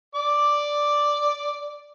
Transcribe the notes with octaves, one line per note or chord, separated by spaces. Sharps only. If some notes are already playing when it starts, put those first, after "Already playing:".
D5 D6